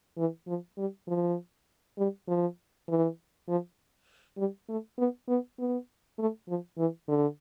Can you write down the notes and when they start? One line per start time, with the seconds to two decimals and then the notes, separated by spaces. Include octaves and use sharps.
0.18 E3
0.47 F3
0.78 G3
1.07 F3
1.98 G3
2.28 F3
2.88 E3
3.48 F3
4.38 G3
4.68 A3
4.98 B3
5.28 B3
5.58 B3
6.19 A3
6.48 F3
6.78 E3
7.08 D3